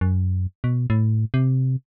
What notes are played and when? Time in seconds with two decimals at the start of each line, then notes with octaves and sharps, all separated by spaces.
0.01 F#2
0.64 B2
0.90 A2
1.34 C3